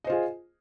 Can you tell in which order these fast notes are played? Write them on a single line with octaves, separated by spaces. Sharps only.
D#5 C5 F4 G#4